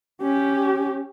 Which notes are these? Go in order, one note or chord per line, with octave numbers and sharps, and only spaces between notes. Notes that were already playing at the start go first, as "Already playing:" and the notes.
C#4 G4